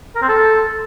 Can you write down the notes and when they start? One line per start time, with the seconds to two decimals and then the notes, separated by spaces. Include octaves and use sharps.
0.15 A#4
0.22 C4
0.29 A4